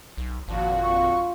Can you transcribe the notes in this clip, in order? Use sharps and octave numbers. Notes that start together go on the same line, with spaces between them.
B1
G#1 F2 A#2 F3 D4 F#4
C4 F4 C#6